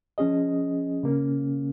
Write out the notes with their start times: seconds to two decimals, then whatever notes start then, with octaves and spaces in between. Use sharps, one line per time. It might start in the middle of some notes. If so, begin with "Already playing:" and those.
0.18 F3 C#4 G#4 D#5
1.03 C#3 A#3 C#4